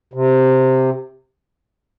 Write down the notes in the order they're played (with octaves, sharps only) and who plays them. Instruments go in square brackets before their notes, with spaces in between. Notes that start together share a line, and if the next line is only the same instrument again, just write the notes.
[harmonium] C3